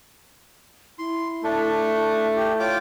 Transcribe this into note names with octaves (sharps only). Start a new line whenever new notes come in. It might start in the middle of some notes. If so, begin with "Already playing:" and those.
E4 C6
A3 D4
G4
F4 C#5 G5 D6